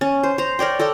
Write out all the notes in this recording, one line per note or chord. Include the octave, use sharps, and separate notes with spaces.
C#4
C5
C5 A#5
A#4 C#5 D5 G5
A4 A#4 D5 G5